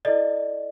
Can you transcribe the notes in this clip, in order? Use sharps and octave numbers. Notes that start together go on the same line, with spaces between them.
E4 A4 D5 D#5